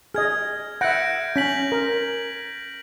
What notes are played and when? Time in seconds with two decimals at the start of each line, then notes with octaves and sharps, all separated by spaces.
0.14 G#4 D#5 F6 G#6
0.81 E5 F#5 G6 A#6 D7
1.36 C#4 G6 B6 F#7
1.72 A#4